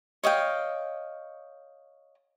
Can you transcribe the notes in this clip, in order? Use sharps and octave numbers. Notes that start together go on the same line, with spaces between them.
C#5 D#5 F5 G5